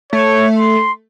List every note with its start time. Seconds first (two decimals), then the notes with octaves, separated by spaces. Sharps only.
0.13 A3 C#5
0.59 C6